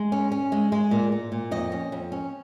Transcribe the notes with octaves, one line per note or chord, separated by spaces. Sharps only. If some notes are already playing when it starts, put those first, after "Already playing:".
Already playing: G#3
C#4
C#4
G#3
G#3
A#2
A#2
A#2
F2 D#5
C#4
F2
C#4